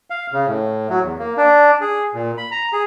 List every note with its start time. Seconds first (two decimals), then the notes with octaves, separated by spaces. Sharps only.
0.10 F5
0.32 C#3
0.47 A2
0.90 F#3
1.03 E2
1.19 A#3
1.37 D4
1.81 G#4
2.14 A#2
2.38 B5
2.51 A#5
2.73 G#4